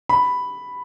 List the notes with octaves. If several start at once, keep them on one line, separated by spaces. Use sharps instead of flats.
B5